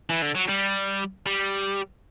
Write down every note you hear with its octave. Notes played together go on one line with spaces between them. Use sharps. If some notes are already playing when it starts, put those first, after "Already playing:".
E3
D3
F#3
G3
G3